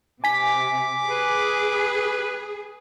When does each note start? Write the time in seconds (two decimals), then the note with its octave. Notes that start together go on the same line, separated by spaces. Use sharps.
0.24 C3 G#5 D6 B6
1.09 G#4 B4